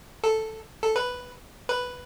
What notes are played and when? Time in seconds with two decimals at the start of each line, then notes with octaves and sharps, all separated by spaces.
0.24 A4
0.83 A4
0.96 B4
1.69 B4